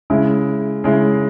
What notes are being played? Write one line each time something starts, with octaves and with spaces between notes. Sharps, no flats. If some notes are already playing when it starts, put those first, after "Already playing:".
C#3 G#3 E4
C#3 G#3 E4